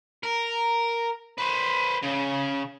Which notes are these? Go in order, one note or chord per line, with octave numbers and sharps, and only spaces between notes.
A#4
B4 C5
C#3